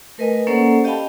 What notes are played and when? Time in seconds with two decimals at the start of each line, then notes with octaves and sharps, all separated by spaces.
0.18 A3 A#4 B4 D#5 G#5
0.47 A#3 C#4 A4 C5 D5 F#5
0.84 G4 D#5 F5 G5 A5 B5